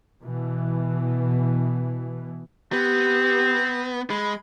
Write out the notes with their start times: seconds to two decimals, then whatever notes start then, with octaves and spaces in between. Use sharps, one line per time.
0.21 B2 E3
2.72 B3 C4 G4
4.10 G#3 B5